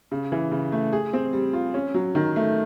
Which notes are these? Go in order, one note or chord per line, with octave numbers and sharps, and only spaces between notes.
C#3
E3
C#3
A3
G#4
C4
G3
F4
C#4
F#3
D#3
A3